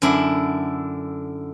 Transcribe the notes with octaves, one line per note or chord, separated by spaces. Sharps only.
F#2 D3 D4 E4